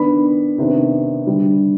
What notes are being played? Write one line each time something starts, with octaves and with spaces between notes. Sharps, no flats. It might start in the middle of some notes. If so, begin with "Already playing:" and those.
Already playing: D#3 B3 D4 B5
C3 D#3 B3 D4
D3 G3 D4